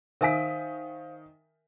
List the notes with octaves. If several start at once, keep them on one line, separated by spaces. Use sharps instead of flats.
D#3 A#4 C5 E5 F5 G#5 D#6 B6